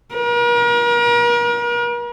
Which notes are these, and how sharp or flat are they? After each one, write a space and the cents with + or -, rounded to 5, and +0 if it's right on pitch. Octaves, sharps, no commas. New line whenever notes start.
A#4 +40